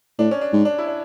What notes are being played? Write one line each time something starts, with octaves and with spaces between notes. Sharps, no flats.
A2 D4
C#4
D4
G#2
D4
E4
D4